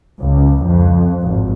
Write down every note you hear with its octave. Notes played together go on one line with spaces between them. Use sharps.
C#2
F2
G#1